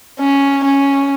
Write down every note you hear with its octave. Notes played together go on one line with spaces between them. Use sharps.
C#4
C#4